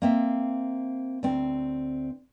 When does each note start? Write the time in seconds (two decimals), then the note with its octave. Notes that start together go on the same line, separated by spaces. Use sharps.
0.02 A#3 C4 E5
1.23 D2 C4